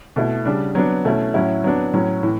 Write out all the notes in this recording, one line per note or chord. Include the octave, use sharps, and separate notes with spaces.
B2 A3 E4
C#3 G3 D4
F#3 B3 D4
B2 A3 C#4 E4
A2 F#3 C#4 E4
F#3 B3 D4
A2 F#3 C#4
A2 E3